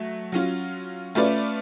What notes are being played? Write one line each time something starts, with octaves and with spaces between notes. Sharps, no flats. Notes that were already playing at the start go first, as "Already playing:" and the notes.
Already playing: F#3 A3
F#3 C#4 F4
A3 C#4 F4 B4 D5